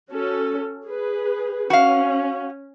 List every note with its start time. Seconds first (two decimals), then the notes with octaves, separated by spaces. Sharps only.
0.10 C#4 F#4 A4
0.84 G#4 B4
1.70 C#4 F#4 F5